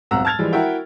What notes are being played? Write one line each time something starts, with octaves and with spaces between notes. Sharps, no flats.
D#1 B1 F2 F#5 A#5 E6
A5 F6 G#6 A6 F7
E3 F3 G3 G#3
E4 F#4 A#4 E5 G5